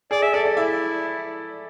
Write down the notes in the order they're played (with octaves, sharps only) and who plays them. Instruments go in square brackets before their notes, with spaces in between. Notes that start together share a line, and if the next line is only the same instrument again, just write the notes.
[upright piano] G#4 [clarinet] D5
[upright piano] G#4 [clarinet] E5
[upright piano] A4 [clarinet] D5
[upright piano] D5
[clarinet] E4 [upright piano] E5